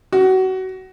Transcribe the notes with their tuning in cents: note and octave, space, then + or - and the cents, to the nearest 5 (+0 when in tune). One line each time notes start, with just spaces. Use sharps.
F#4 +25